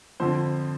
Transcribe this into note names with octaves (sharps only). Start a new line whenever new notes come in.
F2 D3 F3 C5